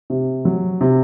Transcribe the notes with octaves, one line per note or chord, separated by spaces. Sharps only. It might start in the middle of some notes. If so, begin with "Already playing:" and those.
C3
F#3
C3